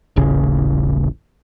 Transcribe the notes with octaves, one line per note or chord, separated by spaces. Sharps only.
D#1 A1 C#3